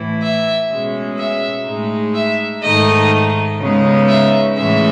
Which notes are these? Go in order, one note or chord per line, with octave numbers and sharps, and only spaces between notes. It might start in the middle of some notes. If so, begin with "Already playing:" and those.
Already playing: A2 E3 A3 E4
E5
B2 G#3 C#4
E5
A2 G#3 D#4
E5
G#2 D#3 A3 D#4 D#5
C#3 G#3 B3 D#4
E5
A2 E3 G#3 C#4 E5